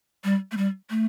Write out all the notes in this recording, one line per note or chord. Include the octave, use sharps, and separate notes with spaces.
G3
A3
G3
A3